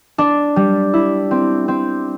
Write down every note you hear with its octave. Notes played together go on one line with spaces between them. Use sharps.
D4
G3
E4
C4
C4